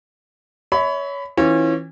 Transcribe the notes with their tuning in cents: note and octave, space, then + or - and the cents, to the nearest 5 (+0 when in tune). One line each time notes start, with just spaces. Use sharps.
C#5 +20 E5 -35 B5 +20
E3 -20 C#4 -30 F4 +0